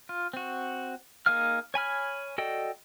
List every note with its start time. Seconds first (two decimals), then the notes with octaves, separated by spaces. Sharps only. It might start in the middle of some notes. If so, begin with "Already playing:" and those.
0.09 F4
0.33 C4 F#4
1.26 A#3 D#4 G#4 F5 F6
1.74 C#5 G#5 B5 F6
2.38 F#4 A4 D5 D#5 G5